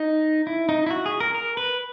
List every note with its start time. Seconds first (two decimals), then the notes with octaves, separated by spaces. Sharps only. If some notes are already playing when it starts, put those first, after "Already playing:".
Already playing: D#4
0.47 E4
0.69 D#4
0.86 E4
0.91 F#4
1.06 G#4
1.20 A#4
1.35 A#4
1.57 B4